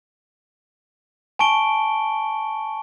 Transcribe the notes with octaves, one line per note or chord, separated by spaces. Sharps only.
G#5 A5 C#6 D7 G7